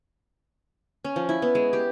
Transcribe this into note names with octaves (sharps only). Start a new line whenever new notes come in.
C#4
F3
E4
B3
G#3
G4